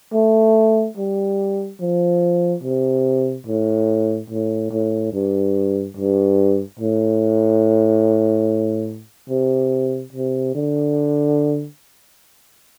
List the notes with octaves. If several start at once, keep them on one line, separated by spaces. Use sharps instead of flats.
A3
G3
F3
C3
A2
A2
A2
G2
G2
A2
C3
C3
D3